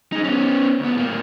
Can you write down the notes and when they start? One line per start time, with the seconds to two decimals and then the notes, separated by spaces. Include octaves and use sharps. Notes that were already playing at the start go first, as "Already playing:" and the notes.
0.12 D#4 G#4
0.24 B3 C#4
0.80 D2 B3
0.97 A2 A#3